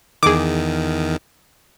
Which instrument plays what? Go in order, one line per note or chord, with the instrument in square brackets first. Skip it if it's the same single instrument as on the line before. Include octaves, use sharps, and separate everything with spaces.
[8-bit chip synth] E2 D#3 [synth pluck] G#4 D6